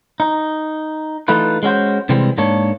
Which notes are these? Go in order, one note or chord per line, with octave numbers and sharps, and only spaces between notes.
D#4
E3 A3 D#4 F4 B4
G#3 C#4 F#4 C5
C3 E3 G3 G#3 C4
G#2 A#3 D4 C#5